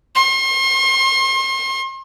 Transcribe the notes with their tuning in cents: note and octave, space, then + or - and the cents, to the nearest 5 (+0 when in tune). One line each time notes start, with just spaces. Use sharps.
C6 +40